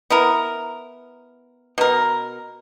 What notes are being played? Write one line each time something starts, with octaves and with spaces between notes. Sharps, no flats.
B3 E4 A#4
B2 A#4